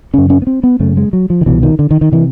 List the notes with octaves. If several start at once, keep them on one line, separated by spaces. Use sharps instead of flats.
F#2 C#3 C#4
C#4
B3
C4
B3
F#2 C#3 A3
G#3
F#3
F3
D#3
C2 B2 E3
D#3
D3
D#3
D#3
C3 E3